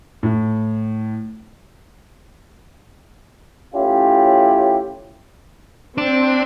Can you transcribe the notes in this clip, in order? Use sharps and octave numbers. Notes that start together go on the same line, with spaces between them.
A2
A2 C#4 E4 F4 G4
C4 D4